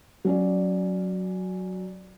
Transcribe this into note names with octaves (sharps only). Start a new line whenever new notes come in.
F#3 C#4 D5